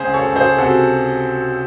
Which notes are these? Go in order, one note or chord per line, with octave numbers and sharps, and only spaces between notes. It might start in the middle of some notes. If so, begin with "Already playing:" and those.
Already playing: C#2 G#4 C5
A4 C#5
C#2
G#4 C5
C3 F#4 A4